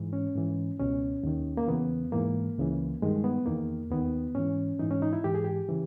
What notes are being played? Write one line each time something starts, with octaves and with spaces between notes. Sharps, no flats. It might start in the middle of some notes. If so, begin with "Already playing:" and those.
Already playing: G#2 E3
C#4
G#2 E3
C#2 B2 C#4
D#2 D#3
A#3
E2 C#3 E3 B3
G#2 E3 A#3
C#2 C#3 E3
G2 D#3 G#3
B3
E2 D#3 A#3
D#2 D#3 B3
G#2 E3 C#4
G#2 E3 D#4
C#4
D#4
E4
G#2 E3 G4
G#4
G4
C#3 E3